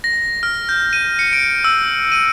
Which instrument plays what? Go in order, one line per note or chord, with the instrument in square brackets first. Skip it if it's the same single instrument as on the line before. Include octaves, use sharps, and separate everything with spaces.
[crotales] A#6
F6
G6
D#7
C#7
D7
E6
D#7